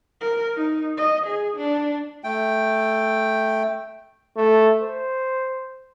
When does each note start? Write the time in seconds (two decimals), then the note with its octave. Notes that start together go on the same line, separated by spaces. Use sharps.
0.21 A#4
0.56 D#4
0.97 D#5
1.27 G#4
1.57 D4
2.24 A3 G5
4.36 A3
4.82 C5